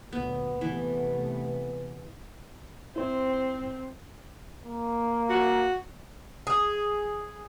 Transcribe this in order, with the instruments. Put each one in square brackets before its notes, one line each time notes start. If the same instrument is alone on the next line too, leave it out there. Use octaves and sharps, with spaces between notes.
[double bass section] D2 A#2 F#3 [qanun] B3
[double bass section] C3 A3 B3 [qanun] E3
[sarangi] C4 [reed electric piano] E4 C5
[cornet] A#3
[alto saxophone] F#4
[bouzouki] G#4